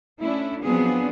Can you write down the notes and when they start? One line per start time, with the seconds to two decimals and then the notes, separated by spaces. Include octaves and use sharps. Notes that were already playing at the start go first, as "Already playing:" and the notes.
0.22 A3 C#4 D4 E4
0.64 F3 F#3 B3 C4 D4 G#4